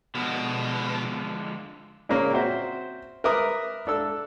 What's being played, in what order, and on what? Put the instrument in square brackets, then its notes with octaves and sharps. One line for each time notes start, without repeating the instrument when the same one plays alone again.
[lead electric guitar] B2 [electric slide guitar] D3 F3 G#3
[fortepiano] A#2 C#3 A#3 C#4
C4 F#4 C5 E5
A#4 B4 E5 D6 D#6
D4 A4 E6